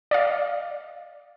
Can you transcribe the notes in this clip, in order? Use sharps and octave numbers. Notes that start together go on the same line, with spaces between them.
D5 D#5 F5